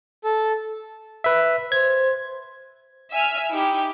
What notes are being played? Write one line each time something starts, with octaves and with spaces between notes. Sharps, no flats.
A4
B4 E5
C5 G#6
E5 G#5 F6
D#4 E4 G4